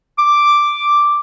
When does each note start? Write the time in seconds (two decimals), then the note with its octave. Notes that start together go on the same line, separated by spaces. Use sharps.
0.18 D6